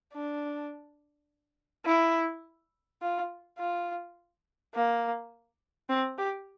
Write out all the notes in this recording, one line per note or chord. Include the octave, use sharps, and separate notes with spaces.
D4
E4
F4
F4
A#3
C4
G4